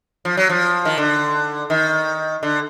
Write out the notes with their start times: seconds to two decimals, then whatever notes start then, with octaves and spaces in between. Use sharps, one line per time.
0.25 F3
0.37 F#3
0.50 F3
0.85 D#3
0.98 D3
1.70 D#3
2.43 D3